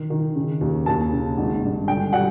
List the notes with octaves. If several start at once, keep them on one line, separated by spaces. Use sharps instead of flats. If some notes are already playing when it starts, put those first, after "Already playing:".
Already playing: D#3
D#3
C#3
D#2
D#2 A5
C#3
G#1
G2
D3 G5
G3 F#5